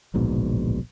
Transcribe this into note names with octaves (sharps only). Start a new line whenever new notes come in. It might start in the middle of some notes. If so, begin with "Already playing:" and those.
D1 A#1 G#2 B2